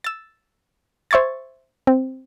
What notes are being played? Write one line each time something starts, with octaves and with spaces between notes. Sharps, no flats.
E6 A6
C5 E5 C#6 G#6 A6
C4